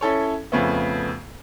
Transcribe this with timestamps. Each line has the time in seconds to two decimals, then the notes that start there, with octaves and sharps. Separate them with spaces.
0.01 C#4 E4 A4 C#5
0.52 F2 C#3 A3 B3